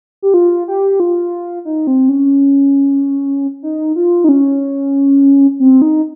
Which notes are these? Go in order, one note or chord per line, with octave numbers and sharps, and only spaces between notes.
G4
F4
G4
F4
D#4
C4
C#4
D#4
F4
D#4
C#4
C4
D#4